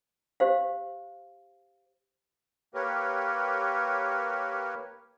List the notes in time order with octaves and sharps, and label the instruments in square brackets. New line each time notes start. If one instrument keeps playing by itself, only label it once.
[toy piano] G4 C5 F5
[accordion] A#3 G4 A#4 B4 C#5